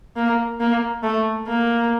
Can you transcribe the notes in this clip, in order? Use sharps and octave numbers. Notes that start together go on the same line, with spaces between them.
A#3
A#3
A3
A#3